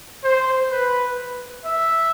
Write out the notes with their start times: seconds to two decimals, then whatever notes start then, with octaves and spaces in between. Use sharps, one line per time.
0.24 C5
0.71 B4
1.65 E5